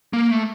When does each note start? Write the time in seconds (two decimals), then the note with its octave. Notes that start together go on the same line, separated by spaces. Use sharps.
0.13 A#3
0.31 A3